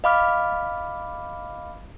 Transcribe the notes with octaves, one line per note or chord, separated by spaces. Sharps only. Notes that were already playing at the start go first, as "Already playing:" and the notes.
D#5 F5 B5 D6 F6